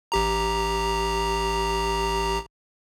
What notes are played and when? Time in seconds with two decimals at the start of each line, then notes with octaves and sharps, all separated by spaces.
0.12 A1 G4 A#5